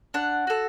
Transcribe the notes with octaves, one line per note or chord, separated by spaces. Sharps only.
D4 F#5
F#4 A4